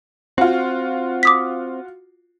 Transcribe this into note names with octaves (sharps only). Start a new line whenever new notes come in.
C4 F4 F#4
D6 D#6 B6